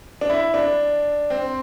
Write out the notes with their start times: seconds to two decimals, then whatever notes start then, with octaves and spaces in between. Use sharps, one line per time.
0.21 D4
0.30 E4
0.54 D4
1.30 C4